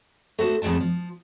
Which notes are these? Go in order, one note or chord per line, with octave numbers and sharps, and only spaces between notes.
A3 F#4 C5
F2 A2 G#3 A3 A5
F3